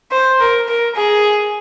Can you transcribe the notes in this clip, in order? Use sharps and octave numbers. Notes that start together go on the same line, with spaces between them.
C5
A#4
A#4
G#4